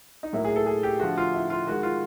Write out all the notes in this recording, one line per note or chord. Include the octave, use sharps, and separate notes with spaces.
D#4
A2 F#3 A#3 E4
G#4
A4
G#4
G4
D3 F3 A3 F#4
F4
E4
F4
D#3 G#3 F#4
F4